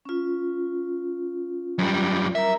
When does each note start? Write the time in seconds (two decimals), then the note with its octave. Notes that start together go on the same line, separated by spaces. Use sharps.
0.05 C#4 F4
1.79 F#2 G3
2.35 A#4 E5 A#5